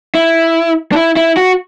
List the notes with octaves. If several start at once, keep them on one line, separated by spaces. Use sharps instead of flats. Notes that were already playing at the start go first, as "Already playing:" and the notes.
E4
D4
E4
E4
F#4